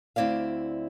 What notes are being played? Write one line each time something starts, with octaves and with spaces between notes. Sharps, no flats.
D2 C4 E4 D5 F5